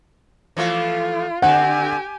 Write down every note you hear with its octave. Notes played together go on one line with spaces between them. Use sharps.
E3 F3 A3 F4
D3 C4 G4 F#5 G#5